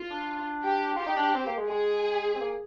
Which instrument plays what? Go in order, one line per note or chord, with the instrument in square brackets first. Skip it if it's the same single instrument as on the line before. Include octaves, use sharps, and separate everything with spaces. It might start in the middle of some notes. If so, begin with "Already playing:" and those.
Already playing: [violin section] F4
[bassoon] D4
[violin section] G4
[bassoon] F4 [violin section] G4
[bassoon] D#4
D4
C4
A#3
G#3
[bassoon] G#3 [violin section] G#4
[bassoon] C4
A#3